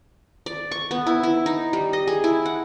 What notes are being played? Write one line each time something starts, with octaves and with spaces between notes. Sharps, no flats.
D5
C#6
B3
E4
E4
D#4
G3
D#5
G#4
E4
F#5